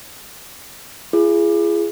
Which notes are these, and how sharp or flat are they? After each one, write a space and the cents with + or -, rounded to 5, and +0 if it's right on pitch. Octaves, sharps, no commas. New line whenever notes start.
F4 -45 G#4 +0